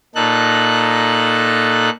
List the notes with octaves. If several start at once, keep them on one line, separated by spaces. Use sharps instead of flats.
A#2 D#4 A4 F#6